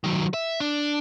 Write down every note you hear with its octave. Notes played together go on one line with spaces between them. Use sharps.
D#3 F#3
E5
D4